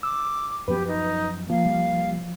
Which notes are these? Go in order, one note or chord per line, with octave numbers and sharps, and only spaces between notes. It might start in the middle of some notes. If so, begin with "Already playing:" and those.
D6 E6
F#2 F3 B3 G4 B4
D#4
F3 A#3 F5
C2 G3 A#3